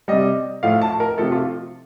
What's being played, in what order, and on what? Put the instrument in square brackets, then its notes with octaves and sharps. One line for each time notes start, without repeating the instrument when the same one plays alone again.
[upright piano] C3 G3 D#5
A2 F3 A3 F5
A5
A#4
C3 F3 A3 A4
F4